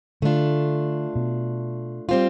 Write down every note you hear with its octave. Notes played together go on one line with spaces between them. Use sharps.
D3 A3 D4 F4
B2
G3 C4 F4